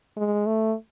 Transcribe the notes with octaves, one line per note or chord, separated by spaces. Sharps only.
G#3
A3